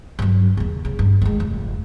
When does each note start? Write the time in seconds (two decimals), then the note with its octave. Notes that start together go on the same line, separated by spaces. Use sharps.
0.19 G2 F#3
0.57 D#2 C#3
0.85 C#3
0.99 G2
1.22 D#3 G#3
1.40 F1